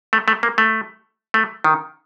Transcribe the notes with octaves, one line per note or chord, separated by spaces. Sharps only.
A3
A3
A#3
A3
A3
D#3